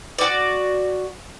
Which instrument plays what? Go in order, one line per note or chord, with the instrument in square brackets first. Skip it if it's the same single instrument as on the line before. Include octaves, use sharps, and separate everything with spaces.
[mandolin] F#4 D5